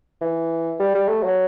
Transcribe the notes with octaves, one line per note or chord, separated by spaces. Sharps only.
E3
G3
G3
A3
F#3